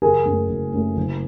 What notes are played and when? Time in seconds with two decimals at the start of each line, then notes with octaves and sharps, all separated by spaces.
0.02 F#1 G#4 A#4
0.25 F#2 C#3 F#3 A3
0.49 F#1
0.73 F#2 C#3 F#3 A3
0.97 F#1